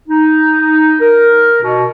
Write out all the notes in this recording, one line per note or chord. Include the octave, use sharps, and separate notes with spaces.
D#4
A#4
B2